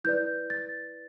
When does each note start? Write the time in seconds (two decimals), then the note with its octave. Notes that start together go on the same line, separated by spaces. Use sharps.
0.04 E4 B4 D5 G6
0.50 A6